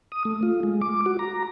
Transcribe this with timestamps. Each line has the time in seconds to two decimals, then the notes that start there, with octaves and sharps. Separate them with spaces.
0.12 D#6
0.25 A3
0.43 F4
0.63 G#3
0.81 D6
1.06 F#4
1.19 A#5